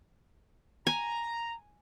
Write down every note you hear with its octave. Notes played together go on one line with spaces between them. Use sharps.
G#5 A#5